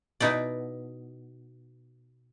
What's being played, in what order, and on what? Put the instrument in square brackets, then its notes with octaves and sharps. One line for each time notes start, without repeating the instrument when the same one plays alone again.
[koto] B2 D#4 E4 D5